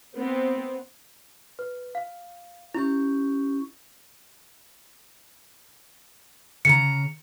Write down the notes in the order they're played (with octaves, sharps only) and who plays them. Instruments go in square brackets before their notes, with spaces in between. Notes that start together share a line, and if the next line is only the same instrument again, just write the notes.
[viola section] B3 C4
[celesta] B4
F5
[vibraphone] C#4 G4 C#6 [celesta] E4
[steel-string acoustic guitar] C#3 A#5 [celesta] C#7